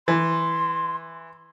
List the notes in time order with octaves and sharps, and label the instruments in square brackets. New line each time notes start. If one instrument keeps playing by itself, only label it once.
[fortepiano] E3 [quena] C6